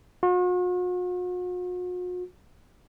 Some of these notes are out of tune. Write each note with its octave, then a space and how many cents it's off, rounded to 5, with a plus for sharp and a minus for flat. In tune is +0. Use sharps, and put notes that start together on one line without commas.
F#4 -45